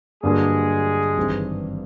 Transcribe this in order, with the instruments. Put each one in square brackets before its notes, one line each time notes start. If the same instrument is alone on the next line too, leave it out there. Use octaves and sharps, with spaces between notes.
[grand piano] G2 D3 F#3 A#3 D4 [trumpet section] G#3 G#4
[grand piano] G#1 G2 E3 G3 C4